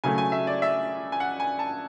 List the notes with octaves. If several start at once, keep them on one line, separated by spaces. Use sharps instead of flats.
C#3 F#3 A3 G#5
G#5
E5
D5
E5
G#5
F#5
G#5
A5